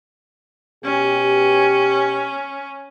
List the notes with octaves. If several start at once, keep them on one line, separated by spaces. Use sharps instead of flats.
B2 C#4 G4